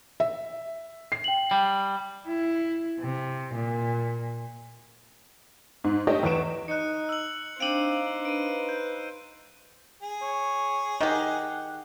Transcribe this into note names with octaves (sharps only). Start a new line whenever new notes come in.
E5
C7
G5 F#7
G3
E4
C3
A#2
G#2
A3 D4 G4 C#5 D#5 G5
E2 B3 C#6 D7 E7
D#4 F#6 C#7
E6 F#7
C4 D4 D#4 C5 F5 D7 D#7
B4 D7 D#7
G6
G#4
C#5
D#3 G4 D#5 F#5